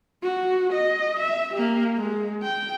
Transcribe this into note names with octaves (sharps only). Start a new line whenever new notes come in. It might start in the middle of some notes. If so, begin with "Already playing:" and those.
F#4
D#5
E5
A#3 G4
G#3
G5